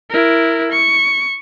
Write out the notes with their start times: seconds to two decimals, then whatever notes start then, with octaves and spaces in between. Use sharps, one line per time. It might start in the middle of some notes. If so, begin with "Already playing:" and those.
0.10 E4 A#4
0.72 C#6